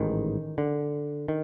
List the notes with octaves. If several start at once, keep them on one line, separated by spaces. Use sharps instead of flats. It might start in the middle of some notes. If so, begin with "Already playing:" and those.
Already playing: A1 G#2 D#3
D3
D#3